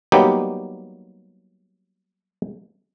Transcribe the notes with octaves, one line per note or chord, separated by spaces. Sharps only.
F#3 G3 A#3 B3 D#4 G4